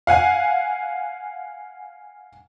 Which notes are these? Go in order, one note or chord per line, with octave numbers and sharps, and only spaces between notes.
F5 F#5 G#5